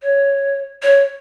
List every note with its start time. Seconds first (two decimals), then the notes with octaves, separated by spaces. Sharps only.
0.02 C#5
0.82 C#5